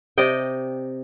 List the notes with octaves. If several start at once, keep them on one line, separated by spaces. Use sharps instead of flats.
C3 D5 D#5 G5